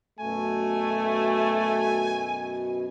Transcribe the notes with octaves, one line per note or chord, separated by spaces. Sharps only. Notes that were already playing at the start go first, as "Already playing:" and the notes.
F#2 B2 A3 G#5